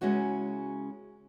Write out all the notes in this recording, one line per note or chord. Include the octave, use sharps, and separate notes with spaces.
C#3 G#3 C#4 E4 F#4 B4